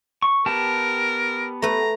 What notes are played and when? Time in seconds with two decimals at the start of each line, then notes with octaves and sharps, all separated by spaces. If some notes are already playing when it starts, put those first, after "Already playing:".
0.22 C#6
0.46 B3 G4 A#4 A5
1.62 A3 B4 A#5